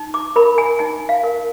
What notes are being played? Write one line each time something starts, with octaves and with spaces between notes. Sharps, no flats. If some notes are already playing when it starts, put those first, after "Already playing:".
Already playing: D#4
D6
A#4 B5
G#5
D#4 G#5
F5
A#4